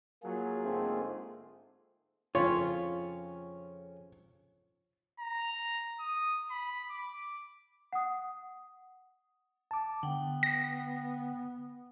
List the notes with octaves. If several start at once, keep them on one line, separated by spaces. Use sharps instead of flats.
F#3 A#3 F4 G#4
G#2 D3 A3 C4
F2 C#3 F4 C#5 B5
A#5
D#6
B5
D6
F#5 D#6
A5 D6
D3 B3 F#5 G5
A#6